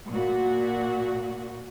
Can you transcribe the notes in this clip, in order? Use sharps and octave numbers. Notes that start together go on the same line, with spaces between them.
A#2 F#4